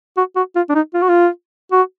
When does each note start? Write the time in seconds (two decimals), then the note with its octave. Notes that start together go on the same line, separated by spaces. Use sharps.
0.17 F#4
0.36 F#4
0.56 F4
0.69 D4
0.75 D#4
0.94 F4
1.02 F#4
1.09 F4
1.72 F#4